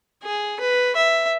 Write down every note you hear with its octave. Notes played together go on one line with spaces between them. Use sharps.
G#4
B4
E5